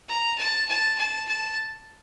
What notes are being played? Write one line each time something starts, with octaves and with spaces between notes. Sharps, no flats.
A#5
A5
A5
A5
A5